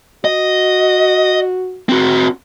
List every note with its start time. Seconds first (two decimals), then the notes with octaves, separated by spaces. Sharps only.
0.25 F#4 D#5
1.89 C4 F#4